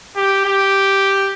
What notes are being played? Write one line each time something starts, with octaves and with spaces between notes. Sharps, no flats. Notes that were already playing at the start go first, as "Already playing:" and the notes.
G4
G4